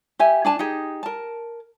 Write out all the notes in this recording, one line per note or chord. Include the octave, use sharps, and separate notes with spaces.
G4 E5 G#5
D4 G#5 A5
D#4 G4 G#4
A#4 A5